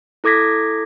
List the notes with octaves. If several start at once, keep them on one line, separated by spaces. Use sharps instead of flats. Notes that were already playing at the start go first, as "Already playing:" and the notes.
E4 A4 D6 G#6 A#6 B6